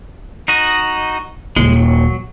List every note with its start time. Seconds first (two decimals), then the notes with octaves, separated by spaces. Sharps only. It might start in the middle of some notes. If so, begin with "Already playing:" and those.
0.48 D#4 F#4 D#5
1.56 D#1 G#3
1.76 F#3